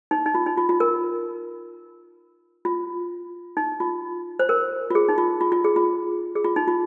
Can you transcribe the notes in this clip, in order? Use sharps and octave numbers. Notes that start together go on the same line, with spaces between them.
D#4
D#4
F4
D#4
F4
F4
A#4
F4
D#4
F4
C5
A#4
F4
G#4
D#4
F4
F4
F4
G#4
F4
G#4
F4
D#4
F4